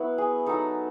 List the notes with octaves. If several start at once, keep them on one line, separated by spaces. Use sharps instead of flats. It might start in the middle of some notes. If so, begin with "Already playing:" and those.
Already playing: F#3 B3 E4 F#4 B4
G#4
F#3 B3 D#4 A4